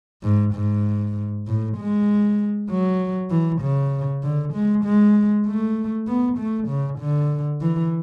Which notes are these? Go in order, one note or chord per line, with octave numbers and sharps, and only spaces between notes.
G#2
G#2
A2
G#3
F#3
E3
C#3
D3
G#3
G#3
A3
B3
A3
C#3
D3
E3